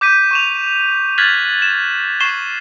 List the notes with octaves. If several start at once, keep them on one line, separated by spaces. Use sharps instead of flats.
D6 G6 B6 D#7
C#6 E7 F7
F6 F#6 G#6 A6 B6 F#7
E7
C#6 C7 E7 G7